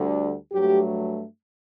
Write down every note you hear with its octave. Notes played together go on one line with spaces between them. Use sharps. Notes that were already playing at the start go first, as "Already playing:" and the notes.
Already playing: D2 D3 G3
G2 F#3 A3 G4